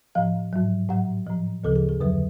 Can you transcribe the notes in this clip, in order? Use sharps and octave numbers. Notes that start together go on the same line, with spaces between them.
A2 F3 F5
G#2 F#3
A2 F#3 F#5
A2 F3
D2 C#3 F3 A4
G#4
G#4
F2 D3 F#3 B4